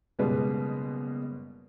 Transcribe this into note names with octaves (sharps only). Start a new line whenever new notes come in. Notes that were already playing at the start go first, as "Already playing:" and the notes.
F#1 B2 G3 G#3 B4